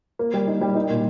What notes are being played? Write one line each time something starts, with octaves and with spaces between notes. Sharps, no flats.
A#3
G3
D#4
G3
D#4
A#2